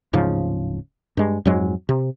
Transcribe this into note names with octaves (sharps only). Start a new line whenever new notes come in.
D1 G#2 C#3 F3
G2 G#3
F2 G#2 F#3 G#3
C3